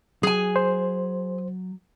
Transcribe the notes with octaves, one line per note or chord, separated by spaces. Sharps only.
F#3 G#4 G#5
C5